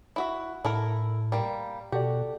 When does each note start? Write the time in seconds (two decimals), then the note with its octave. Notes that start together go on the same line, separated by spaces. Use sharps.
0.16 E4 F#4 E5
0.65 A2 E4 A4 A#4
1.32 G3 A#3
1.92 B2 F#4 G4 A4 D5